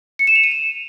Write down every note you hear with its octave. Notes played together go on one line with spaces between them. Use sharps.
C#7
E7
F7
D#7
E7